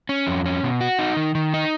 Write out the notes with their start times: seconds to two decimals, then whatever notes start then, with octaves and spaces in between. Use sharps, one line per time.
0.09 C#4
0.27 F2
0.46 C#4
0.63 B2
0.81 F#4
0.99 D#4
1.17 D#3
1.35 D#3
1.54 D#4